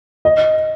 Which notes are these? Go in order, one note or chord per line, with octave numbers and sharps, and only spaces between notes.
D#5